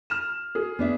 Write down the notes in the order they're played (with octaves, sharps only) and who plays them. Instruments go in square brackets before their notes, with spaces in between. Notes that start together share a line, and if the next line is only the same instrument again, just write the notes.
[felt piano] F6 E7
G#4
[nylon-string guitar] B3 D4 E5